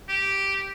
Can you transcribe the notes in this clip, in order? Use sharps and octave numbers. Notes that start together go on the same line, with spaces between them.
G4